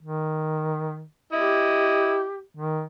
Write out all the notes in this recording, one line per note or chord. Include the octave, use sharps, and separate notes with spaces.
D#3
E4 G4 D#5
D#3